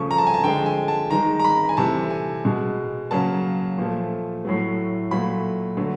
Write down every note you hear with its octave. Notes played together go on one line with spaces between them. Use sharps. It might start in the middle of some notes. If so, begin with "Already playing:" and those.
Already playing: C#3 F3 A3 C#6
A#5
A5
G#5
A5
D3 F3 G#3 G5
G#5
A5
D#3 G#3 A#5
A#5
B5
G#5
C3 E3 A3 A5
G#5
B2 G#3
C#3 F#3 A#3 A5
A#2 F3 A3
A2 F#3 A3
A#2 F#3 A3 B5
D3 F#3 A3